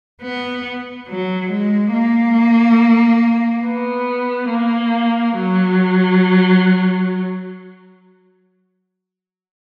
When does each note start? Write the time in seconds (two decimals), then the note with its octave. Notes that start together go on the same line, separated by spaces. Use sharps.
0.21 B3
1.08 F#3
1.50 G#3
1.93 A#3
3.65 B3
4.50 A#3
5.36 F#3